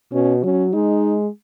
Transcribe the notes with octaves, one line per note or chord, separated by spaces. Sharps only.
B2 C#4
F#3 C#4
G#3 D#4